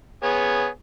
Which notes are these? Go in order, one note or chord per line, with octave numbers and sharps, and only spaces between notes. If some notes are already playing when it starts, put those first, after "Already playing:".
B3 G#4 C#5